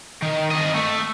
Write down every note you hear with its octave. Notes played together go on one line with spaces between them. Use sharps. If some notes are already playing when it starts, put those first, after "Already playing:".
D#3
C4 D#5
A3